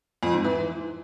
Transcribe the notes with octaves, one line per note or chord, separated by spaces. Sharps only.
F2
G#2
E3